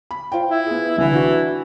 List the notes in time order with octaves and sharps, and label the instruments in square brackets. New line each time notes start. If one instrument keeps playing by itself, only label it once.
[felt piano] B5
F4 C5 G5
[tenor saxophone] E4
[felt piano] B3 G#4
[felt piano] C2 D3 [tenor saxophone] E3
[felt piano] D4 F#4